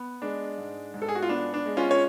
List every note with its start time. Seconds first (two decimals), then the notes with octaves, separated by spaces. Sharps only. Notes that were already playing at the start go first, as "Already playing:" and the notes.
Already playing: B3
0.22 G#3 D4
0.58 G#2
0.94 G#2
1.02 A4
1.09 G#4
1.15 F#4
1.23 F4
1.29 B3 D4
1.54 D4
1.66 G#3
1.77 C#4 F4
1.91 C#5